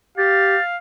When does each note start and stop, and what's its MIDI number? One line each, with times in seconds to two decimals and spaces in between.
0.18 0.57 67
0.18 0.77 77
0.18 0.62 93